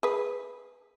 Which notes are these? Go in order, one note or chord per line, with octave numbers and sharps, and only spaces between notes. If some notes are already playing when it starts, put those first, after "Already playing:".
G#4 B4